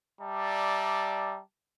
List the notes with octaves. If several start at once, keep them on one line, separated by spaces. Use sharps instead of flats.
G3 D5 E5 A5 A#5